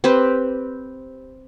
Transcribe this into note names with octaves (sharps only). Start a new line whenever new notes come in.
C4 G4 B4